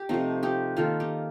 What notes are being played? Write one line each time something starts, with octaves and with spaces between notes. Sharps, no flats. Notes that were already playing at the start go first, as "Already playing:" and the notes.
Already playing: G4
C3 F3 A3 C4 D#4
D#4 G4
D#3 A#3 F4 A4
D#4 G4